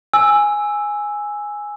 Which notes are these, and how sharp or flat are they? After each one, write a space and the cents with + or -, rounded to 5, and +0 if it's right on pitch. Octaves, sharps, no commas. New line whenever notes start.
G#5 +0 E6 +0